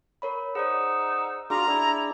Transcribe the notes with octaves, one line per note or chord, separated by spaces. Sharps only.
A#4 C#5 B5
D#4 G#4 C5 D5 F#5 E6
D4 F4 F#4 G#4 A#5 D6
D4 E4 G#4 D5